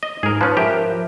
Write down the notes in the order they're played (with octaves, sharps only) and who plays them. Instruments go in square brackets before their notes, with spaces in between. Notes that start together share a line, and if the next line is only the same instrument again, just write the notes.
[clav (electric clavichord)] D#5
[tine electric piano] G#2 [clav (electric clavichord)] G#4 A#4
[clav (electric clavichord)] F3 C#4 [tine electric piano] B4 A5
[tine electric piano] F3 A#4 E5 [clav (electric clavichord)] G4